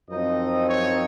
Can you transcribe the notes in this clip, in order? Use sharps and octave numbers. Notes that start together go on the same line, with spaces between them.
F#2 F3 C4 D#4 D#5
C#5